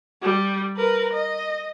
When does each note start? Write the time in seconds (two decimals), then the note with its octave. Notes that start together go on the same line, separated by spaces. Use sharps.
0.22 G3
0.77 A#4 B4
1.13 D#5